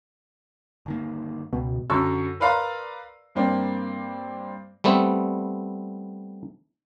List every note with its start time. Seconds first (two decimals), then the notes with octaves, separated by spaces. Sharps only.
0.86 G1 D#3 A#3
1.53 C#2 B2
1.90 F#2 D3 F#3 A5 C#6 E6
2.40 A#4 B4 D5 F5 A#5 C6
3.35 G2 A#3 C4 D4
4.84 G3 A3 B3 C4